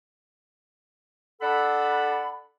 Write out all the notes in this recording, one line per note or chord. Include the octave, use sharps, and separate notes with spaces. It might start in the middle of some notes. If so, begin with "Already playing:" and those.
D4 A4 F#5 B5